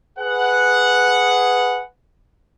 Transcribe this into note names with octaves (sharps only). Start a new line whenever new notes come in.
G#4 B4 F#5